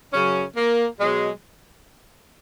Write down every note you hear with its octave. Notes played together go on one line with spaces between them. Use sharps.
F#2 C#3 F#3 C#4
A#3
B2 F#3 G#3